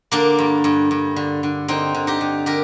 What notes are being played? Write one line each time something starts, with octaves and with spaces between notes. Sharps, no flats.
D3 A#3 D4
G2
G2
G2
D3
D3
D3 C4 D#4
D3
D#4 G4
D3
D3 G4 A#4